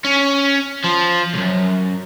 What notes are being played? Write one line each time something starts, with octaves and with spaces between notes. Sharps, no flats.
C#4
F3
B1 F#2